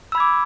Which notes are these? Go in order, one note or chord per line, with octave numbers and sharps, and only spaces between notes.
B5 D6 E6 G#6